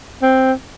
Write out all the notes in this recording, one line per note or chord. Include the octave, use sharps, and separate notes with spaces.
C4